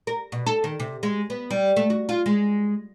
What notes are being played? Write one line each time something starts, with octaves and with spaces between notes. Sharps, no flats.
A#4
B2
A4
D#3
C3
G#3
B3
G3
A3
F#4
F4
G#3